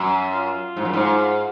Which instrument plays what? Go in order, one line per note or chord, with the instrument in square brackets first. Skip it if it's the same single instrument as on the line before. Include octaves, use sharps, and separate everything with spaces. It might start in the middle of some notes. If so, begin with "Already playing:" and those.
Already playing: [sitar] F#2
[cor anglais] F4
[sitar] G#2
F#2
G#2